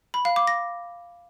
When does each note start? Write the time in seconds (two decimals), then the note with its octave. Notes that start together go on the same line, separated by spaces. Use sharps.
0.14 B5
0.25 F5
0.36 D6
0.47 A#6